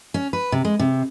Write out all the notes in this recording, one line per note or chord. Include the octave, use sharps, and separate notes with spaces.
C#4
B4
C3
G#3
C3